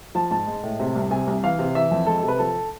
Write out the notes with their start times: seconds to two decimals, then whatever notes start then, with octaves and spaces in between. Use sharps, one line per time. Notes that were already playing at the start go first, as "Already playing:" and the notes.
0.15 F3 A5
0.31 G#2 A5
0.47 G#3
0.63 A2
0.80 C3
0.96 C2
1.11 C3 G#5
1.27 C2
1.43 E3 F5
1.59 C3
1.75 E3 E5
1.91 F2
2.07 G#3 A4
2.18 A4
2.23 C3
2.28 B4
2.39 F3 A4